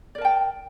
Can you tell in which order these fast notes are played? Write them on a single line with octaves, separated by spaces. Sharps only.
D5 A#4 A5 G5